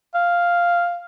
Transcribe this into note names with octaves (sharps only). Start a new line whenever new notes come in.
F5